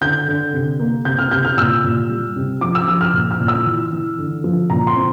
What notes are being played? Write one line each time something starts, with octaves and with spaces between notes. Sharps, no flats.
D3 G6
D3
C3
A#3
C3 G6
F6
C3 G6
F6
A#2 E6
A#2
G3
C3
F3 D6
E6
F3 E6
F6
A#2
F6
A#2
E6
E3
E3
D3
F3
A#2 A#5
C6
C4